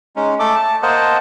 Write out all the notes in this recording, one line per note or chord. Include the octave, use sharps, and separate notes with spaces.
G#3 C#4 D#4
A3 A4 D6
A5
A#3 A#4 C5 D#5 F#5 A5